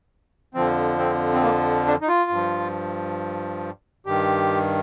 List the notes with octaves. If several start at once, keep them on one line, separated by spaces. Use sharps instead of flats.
F2 D3 F3 C4
C4
C4
A#3
D4
D#4
F4
G2 F3
G2 D#3 G4